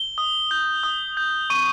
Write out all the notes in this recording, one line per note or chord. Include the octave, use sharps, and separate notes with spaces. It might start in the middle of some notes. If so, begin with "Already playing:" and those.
Already playing: G7
D#6
G6
D#6
G6
C#6 D#7